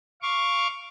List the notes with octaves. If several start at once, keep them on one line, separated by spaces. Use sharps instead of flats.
F5 C#6 D6